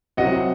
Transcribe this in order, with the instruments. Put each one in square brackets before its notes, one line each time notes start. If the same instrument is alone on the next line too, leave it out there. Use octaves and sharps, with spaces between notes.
[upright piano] C2 C3 F#3 C4 E4 [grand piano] D#5 F#5